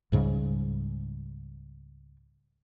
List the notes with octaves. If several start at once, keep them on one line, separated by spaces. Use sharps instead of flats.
C#2 G#2 C#3 G3